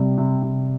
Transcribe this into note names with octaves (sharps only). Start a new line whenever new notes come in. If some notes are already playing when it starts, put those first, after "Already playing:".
Already playing: C3 G3
C3
C3